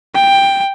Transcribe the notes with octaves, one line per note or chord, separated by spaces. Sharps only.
G5